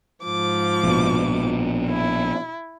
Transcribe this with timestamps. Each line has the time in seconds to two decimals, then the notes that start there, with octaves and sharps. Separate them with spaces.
0.24 G#2 F3 D6
0.84 A#1 B2
1.91 E4